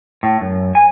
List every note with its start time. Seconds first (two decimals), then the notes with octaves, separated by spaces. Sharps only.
0.23 A2
0.41 F#2
0.75 G#5